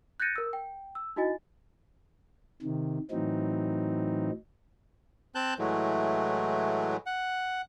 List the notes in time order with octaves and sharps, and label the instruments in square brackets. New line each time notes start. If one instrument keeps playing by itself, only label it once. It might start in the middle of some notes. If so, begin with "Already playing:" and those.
[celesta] F#6 G6 A6 A#6 C#7 D#7
A#4 E6
G5
E6
D#4 E4 F#4 D#5 G#5 A6
[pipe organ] C3 D#3
A2 E3 F#3 C4 D#4
[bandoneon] C4 A5 F#6 G6
A2 E3 F#3 G#3 A3
F#5